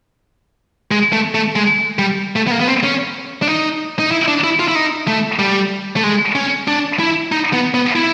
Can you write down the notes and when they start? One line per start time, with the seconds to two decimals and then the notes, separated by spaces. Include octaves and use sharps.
0.91 G#3
1.12 A3
1.35 A3
1.56 G#3
1.99 G3
2.36 A3
2.47 B3
2.51 A#3
2.60 B3
2.68 C4
2.84 C#4
3.42 D4
3.48 D#4
3.99 D#4
4.11 E4
4.28 D4
4.44 E4
4.60 F4
4.68 E4
4.75 D#4
5.08 A3
5.39 G3
5.96 A3
6.04 G#3
6.35 C#4
6.68 D4
6.99 E4
7.32 D#4
7.53 B3
7.74 B3
7.96 E4